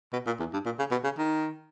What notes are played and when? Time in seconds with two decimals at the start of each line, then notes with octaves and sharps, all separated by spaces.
0.13 B2
0.26 A#2
0.40 E2
0.53 G2
0.65 A#2
0.79 C#3
0.91 B2
1.04 C#3
1.18 D#3